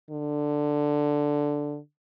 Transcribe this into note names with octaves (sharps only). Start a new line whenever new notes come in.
D3